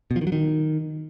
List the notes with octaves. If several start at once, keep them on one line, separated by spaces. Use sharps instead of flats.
B2
F3
D#3
F#3
D#3